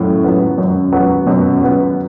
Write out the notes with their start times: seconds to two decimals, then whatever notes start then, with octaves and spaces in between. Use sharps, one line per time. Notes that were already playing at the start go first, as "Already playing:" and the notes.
Already playing: F#2 A2
0.24 F#3 B3
0.58 F#2
0.92 F#3 B3
1.26 F#2 B2
1.61 F#3 B3